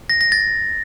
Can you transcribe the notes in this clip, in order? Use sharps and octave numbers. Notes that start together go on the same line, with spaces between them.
A#6
A#6
A6